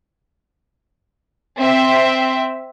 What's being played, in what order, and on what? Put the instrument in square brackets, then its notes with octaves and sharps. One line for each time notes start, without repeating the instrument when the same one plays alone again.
[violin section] C4 E5